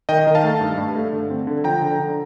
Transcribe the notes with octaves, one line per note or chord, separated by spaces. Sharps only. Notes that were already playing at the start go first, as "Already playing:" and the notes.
D#3 D#5 G5
D#3
F5 A5
A3
G2
G2
A3
D3
C4
D3
F3 G5 A#5
D3
D3